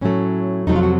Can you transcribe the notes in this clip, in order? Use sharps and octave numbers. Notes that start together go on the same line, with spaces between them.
A2 F#3 A3 C#4
F2 C3 F#3 A3 D#4
F4
F#4